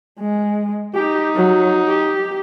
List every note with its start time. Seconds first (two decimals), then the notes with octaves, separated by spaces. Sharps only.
0.19 G#3
0.95 D#4 G4
1.35 F#3
1.88 G4